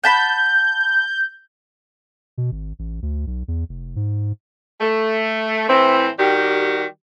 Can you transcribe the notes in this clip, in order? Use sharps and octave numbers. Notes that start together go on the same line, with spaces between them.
F#5 A5 B5 G6
B2
G#1
A1
D2
B1
E2
F1
G#2
A3
A2 E3 C4
D#3 G3 F#4 G4